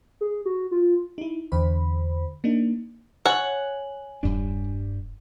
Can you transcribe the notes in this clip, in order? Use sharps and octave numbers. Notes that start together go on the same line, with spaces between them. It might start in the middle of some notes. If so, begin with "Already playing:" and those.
G#4
F#4
F4
D#4 E4
E2 D3 C5 B5
A#3 D4 D#4
C#5 F#5 G#5 F#7
E1 G2 G3 D4